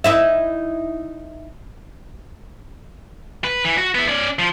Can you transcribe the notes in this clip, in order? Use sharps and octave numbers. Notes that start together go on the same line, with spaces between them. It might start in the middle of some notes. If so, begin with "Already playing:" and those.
D#4 E4 E5
B4
E3
F#4
B3 E4
C#4 D5
F3